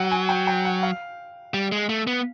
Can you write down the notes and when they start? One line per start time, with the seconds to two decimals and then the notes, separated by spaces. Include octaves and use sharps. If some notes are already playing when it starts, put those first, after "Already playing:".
Already playing: F#3 F#5 G5
0.11 G#5
0.29 G5
0.47 G5
0.65 F#5
0.83 F5
1.54 G3
1.72 G#3
1.89 A3
2.07 B3